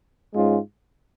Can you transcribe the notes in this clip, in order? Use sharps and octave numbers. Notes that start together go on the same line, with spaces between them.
G#2 G#3 C#4 F4